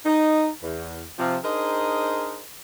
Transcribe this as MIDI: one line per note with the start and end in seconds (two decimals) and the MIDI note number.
0.06 0.48 63
0.63 1.02 40
1.19 1.36 48
1.19 1.36 53
1.44 2.43 62
1.44 2.43 63
1.44 2.43 68
1.44 2.43 70
1.44 2.43 72
1.44 2.43 75